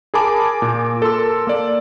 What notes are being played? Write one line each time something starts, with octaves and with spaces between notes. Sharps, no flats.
G#4 A#4 G#5 A5 B5 D6
A#2
A4 A#4 C6 E6
A#3 D5